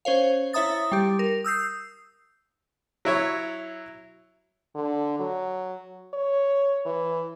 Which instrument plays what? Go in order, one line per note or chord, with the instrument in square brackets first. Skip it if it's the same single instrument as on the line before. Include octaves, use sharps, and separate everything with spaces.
[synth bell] C#4 C5 C#5 F5
E4 C#5 E5 A#5 D#6 A6
G3 G4
A#4
D#6 E6 G6 C7
[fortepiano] F#3 E4 C#5
[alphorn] D3
F#3
C#5
E3